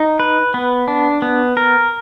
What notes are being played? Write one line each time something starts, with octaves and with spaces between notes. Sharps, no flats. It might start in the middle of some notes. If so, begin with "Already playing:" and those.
Already playing: D#4
B4
B3
D4
B3
A#4